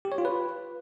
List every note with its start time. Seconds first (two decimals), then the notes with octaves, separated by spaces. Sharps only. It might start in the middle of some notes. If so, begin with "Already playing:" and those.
0.05 G4
0.12 C#5
0.18 F4
0.25 B4